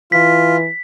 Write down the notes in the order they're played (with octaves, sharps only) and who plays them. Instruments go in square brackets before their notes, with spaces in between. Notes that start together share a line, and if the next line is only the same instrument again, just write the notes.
[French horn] E3 [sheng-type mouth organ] F4 [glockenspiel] B6